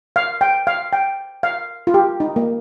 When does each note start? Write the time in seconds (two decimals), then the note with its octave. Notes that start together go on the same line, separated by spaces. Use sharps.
0.16 F5
0.41 G5
0.67 F5
0.93 G5
1.43 F5
1.87 F4
1.94 G4
2.20 D#4
2.36 A#3